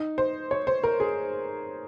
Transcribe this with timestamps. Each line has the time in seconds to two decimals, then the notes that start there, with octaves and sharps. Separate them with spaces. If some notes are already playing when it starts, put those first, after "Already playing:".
Already playing: D#4
0.18 C5
0.51 C#5
0.67 C5
0.84 A#4
1.00 G#4